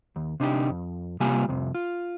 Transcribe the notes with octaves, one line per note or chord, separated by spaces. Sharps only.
D#2
C3 D4 D#4 G4
F2
C3 G3 A#3 F4 G4 G#5
C2 F2 C3
F4